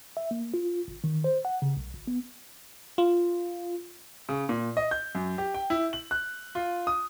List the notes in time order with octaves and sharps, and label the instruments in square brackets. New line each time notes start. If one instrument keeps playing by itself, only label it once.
[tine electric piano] E5
A#3
F4
G1
D#3
C5
F#5
C#3
B1
G1
B3
[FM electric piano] F4
[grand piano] C#3
A#2
D#5
G6
F#2
G4
G5
E4
F#7
F#6
F4
D#6